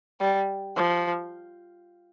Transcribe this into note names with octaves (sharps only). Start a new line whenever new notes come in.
G3
F3